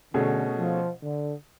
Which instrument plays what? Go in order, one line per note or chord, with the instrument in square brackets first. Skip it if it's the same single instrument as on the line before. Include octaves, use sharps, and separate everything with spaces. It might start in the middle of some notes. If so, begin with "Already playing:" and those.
[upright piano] B2 A3 C#4 G#4 [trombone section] D3
[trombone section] F3
D3